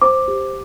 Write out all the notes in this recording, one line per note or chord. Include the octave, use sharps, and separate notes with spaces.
C5 D6
G4